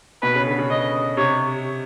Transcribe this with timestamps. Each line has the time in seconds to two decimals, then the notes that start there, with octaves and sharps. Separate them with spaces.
0.22 B2 B4
0.35 C#3
0.46 D3
0.58 C#3
0.70 D#5
1.17 C3 C#5